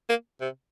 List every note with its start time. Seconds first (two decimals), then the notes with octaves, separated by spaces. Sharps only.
0.10 A#3
0.41 C3